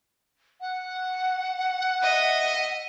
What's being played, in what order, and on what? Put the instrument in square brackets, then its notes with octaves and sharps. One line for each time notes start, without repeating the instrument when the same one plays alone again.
[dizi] F#5
[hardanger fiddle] D#5 E5